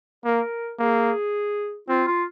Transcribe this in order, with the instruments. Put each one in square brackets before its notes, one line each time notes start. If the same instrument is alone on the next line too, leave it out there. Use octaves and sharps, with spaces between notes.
[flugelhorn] A#3 [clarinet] A#4
[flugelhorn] A#3 [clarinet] G#4
[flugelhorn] C4 [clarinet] F4
[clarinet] F4